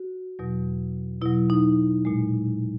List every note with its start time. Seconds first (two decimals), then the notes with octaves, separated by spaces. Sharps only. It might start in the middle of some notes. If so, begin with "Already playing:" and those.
Already playing: F#4
0.39 E2 B2 F#3
1.22 B2 F#3 E4
1.50 D#4
2.05 A#2 G#3